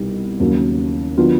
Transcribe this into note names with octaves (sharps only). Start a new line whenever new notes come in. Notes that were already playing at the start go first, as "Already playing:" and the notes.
Already playing: C2 B2 G3 B3 D#4
D#2 C#3 F#3 A#3
D#3 F#3 B3 D4 F4